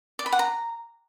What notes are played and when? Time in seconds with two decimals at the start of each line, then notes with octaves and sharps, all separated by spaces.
0.19 D5
0.26 B5
0.32 F#5
0.39 A#5